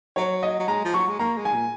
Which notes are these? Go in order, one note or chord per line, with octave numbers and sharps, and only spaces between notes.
F#3 C#5
D#5
F#3
G#3 A#5
F3
F#3 C#6
G#3
A#3 A#5
G#3
G#5
A#2